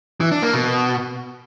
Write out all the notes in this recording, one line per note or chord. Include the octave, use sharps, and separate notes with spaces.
E3
D4
A#3
B2